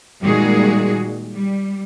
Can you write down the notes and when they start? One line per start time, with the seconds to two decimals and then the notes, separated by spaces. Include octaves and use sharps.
0.22 A#2 D#3 G3 G#3 F#4 G#4
1.32 G3